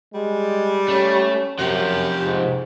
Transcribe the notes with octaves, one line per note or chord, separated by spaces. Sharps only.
G3 G#3
A3 C#4
F#2 C3 F3 G4
G#2